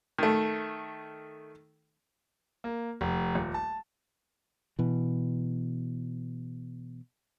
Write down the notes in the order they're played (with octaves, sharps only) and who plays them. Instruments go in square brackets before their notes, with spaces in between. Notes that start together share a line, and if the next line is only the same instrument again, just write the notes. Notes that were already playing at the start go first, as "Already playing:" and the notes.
[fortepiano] D#3 A3
[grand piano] A#3
F1
D#1
A5
[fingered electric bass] B2 E3